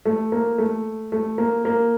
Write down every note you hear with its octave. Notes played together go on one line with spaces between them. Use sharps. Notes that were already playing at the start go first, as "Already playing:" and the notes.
A3
A#3
A3
A3
A#3
A#3